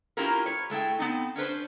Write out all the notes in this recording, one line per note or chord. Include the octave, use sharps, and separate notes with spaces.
A#3 C#4 E4 F4 G4 A#4
B4 C#5
G#3 A3 E4 G5
B3 C4 D#4
C#4 D4 B4 C5